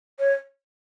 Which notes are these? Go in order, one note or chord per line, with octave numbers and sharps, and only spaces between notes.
C#5